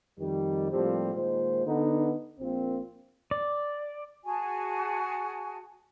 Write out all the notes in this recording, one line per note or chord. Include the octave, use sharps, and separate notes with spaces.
F2 D#3 G3
A2 F3 G3 A#3 C4 G4
A#2 D#3 G#3 A#3 C5
D3 B3 D#4
A#1 A#2 A#3 C4
D5
F#4 G#4 G#5 A5